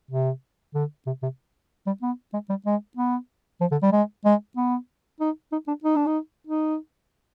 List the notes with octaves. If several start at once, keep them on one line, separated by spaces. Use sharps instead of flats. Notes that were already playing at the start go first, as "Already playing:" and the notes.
C3
D3
C3
C3
G3
B3
G#3
G3
G#3
B3
F3
D3
G3
G#3
G#3
B3
D#4
D#4
D4
D#4
D4
D#4
D#4